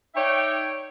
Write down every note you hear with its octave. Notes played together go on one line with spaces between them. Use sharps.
D#4 C#5 D5 E5 G5